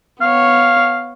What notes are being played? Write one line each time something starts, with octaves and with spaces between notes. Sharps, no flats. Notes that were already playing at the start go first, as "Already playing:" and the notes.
B3 C#5 F5